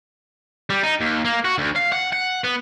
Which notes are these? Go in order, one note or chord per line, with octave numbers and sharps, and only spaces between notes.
G3
D#4
D#2
A#3
F#4
D2
F5
F#5
F#5
B3